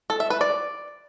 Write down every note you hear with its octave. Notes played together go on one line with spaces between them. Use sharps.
A4
E5
B4
D5